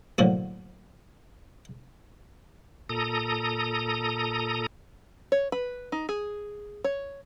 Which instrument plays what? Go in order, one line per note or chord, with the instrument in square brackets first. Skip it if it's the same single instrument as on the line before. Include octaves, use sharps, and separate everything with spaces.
[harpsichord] A2 D3 F3 F#3 A#3
[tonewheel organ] A#2 A4 A#5 D#6
[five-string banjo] C#5
B4
D#4
G#4
C#5